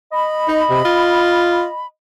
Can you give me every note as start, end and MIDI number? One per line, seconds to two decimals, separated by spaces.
0.12 1.85 75
0.12 1.85 83
0.48 0.63 63
0.70 0.81 48
0.85 1.66 65